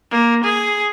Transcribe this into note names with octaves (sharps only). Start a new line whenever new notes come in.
A#3
G#4